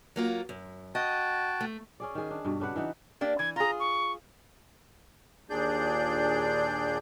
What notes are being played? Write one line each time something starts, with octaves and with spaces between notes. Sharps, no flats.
F#3 A#3 F4
F#2
F#4 D#5 G5 A5
A3
C#4 G#4 D5
D#3 G#4
D4
G2 B2
C#3 D4 B4 F#5
E3 D#4 F#5
A#3 D4 G4
E3 G#6
F4 G#4 A#5
C#6
D#2 A#2 D4 G#4 D5 G6